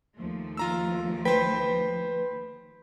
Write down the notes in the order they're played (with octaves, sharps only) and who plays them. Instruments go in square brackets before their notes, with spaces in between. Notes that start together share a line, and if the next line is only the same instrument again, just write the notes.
[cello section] D#2 F3 A3
[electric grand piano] F4 A#5 E6
[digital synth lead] B4 [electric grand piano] C5 G5